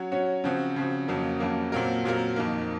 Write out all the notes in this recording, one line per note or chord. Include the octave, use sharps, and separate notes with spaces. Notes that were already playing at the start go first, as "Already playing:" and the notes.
Already playing: F#3 C#4 F#4 C#5
F#3 C#4 F#4 C#5
C#3 F3 C4 F#4
C#3 F3 C4 F#4
F2 C#3 F#3 A#3
F2 C#3 F#3 A#3
A#2 F#3 C4 F4 A#4
A#2 F#3 C4 F4 A#4
F2 D#3 A#3